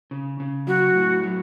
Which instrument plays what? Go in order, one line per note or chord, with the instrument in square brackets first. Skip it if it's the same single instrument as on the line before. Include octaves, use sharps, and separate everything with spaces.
[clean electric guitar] C#3
C#3
[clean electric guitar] F#3 [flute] F#4
[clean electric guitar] A2
F#3